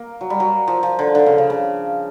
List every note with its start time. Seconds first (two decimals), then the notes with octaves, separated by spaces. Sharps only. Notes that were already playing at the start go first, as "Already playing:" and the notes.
Already playing: A#3
0.21 F#3
0.30 G3
0.40 F#3
0.68 F3
0.83 F3
0.99 D3
1.15 D3
1.26 C#3
1.38 C#3
1.50 C#3